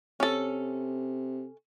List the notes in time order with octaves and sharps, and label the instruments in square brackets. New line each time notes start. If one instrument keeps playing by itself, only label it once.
[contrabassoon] C3 [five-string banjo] C#4 A4